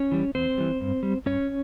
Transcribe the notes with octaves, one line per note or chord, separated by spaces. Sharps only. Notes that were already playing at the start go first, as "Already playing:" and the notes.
Already playing: C#4 C#5
E3 G3
E2 C4 C5
E3 G3
G2
G3
G2 C#4 C#5